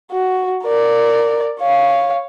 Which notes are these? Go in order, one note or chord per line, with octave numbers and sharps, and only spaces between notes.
F#4
A#4 D5
C#5 F5